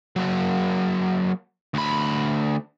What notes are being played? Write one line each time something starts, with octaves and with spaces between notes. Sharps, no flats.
F#3 A#3
D2 B5